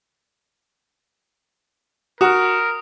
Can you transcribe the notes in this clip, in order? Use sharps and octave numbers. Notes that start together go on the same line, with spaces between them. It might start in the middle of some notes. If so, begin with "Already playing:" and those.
F#4 A#4 D#6